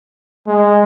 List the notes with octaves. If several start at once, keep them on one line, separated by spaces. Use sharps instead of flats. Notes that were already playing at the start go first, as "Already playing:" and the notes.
G#3